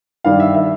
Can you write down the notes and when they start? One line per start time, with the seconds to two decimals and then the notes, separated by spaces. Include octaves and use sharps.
0.24 G2 D#3 F5
0.40 E5
0.54 E5